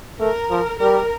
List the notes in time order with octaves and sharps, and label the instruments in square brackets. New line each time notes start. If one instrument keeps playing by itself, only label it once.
[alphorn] A3 [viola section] A#4
[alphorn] F3
[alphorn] G3 [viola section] A#4